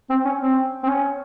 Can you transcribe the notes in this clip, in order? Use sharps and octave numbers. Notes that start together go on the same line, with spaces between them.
C4
C#4
C4
C4
C#4